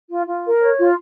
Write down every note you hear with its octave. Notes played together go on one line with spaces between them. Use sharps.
F4
F4
A#4
C#5
F4